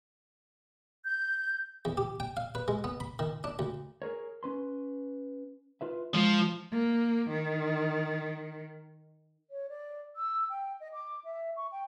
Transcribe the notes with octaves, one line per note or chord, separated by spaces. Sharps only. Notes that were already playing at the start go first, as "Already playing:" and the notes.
G6
E2
G4
G5
F5
B4
G#3
B3
B5
D#3
D4
D2
G#4 A#4 C#5
C#4 B4 C6
F4 B4 E5
F3 G#3 F4
A#3
D#3
C#5
D5
E6
G5
D#5
D6
E5
C#6
G5